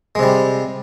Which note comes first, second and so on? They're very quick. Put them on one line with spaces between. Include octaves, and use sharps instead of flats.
G#3 C3 G3